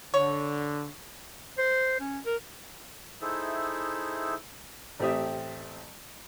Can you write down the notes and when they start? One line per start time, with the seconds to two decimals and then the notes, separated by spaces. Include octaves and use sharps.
0.14 D3 C#5
1.58 C5
2.00 C#4
2.25 A#4
3.22 D#4 E4 G#4 A4 C5 E5
5.00 A1 A3 C4 G4 E5 D#6